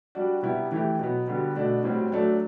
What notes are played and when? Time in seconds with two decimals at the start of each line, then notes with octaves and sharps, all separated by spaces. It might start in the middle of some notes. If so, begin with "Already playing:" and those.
0.15 G3 D4 F#4
0.43 C3 G3 B3 E4 G4
0.72 E3 A3 E4 G4
0.99 B2 F#3 B3
1.27 D3 G3 B3 F#4
1.56 B2 A3 D4 F#4
1.84 A2 G3 C4 F#4
2.12 F#3 A3 D4